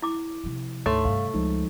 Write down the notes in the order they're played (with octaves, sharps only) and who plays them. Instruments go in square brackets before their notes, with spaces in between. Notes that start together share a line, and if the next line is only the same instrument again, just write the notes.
[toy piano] E4 D6
[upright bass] C3 F3
[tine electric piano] D2 C6 [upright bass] G#2 [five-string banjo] A3 [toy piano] C#5
[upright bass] G2 C3 [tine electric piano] F5
[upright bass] C#2 [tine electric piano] F3 G#3 D#4